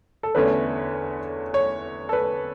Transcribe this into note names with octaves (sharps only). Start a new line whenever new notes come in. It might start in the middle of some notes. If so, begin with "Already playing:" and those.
A4
E2 D3 A3 C#4 B4
C#5
A4
B4